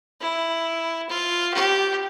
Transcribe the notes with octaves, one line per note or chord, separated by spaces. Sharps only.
E4
F4
G4